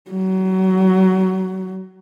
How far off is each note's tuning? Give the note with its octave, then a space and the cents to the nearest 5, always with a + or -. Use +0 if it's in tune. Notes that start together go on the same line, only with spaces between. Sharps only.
F#3 +25